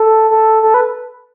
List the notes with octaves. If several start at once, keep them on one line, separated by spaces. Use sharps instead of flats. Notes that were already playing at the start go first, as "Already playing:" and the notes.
Already playing: A4
A4
A4
B4